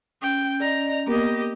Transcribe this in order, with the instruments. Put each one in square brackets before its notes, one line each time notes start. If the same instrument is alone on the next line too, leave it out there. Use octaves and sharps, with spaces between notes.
[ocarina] C#4 [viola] G5
[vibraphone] D5 D#5 [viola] A#5
[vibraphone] A#3 B3 A#4 [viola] G4 D#5